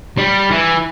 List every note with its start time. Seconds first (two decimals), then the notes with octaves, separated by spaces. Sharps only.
0.18 G3
0.51 E3